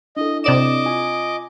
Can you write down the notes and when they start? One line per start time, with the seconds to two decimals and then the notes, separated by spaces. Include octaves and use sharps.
0.17 D4 E4 A4 D#5
0.44 C3 D5 D#5 D6 E7
0.86 F4 G#5